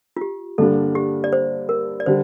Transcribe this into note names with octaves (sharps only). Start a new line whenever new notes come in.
F4
G4
G2 D3 G3 A#3 D4 A4
G4
D5
C5
A#4
D5
D3 G3 C5